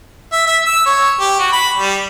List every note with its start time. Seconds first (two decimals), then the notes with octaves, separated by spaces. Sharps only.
0.32 E5
0.47 E5
0.66 E6
0.86 C#5
1.20 G4
1.39 F#4
1.52 B5
1.77 G3